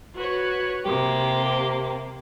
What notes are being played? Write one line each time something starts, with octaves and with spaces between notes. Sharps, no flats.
F#4 B4 C#5
C3 A#3 G4